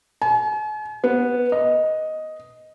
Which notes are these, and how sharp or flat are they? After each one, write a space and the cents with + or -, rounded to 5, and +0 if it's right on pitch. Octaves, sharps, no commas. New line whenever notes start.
G#5 +45
B3 -10
D#5 +5